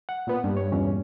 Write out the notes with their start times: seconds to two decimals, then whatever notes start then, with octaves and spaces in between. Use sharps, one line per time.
0.09 F#5
0.27 A#2 B3
0.44 G2
0.57 C#5
0.72 E2 A#2 C#4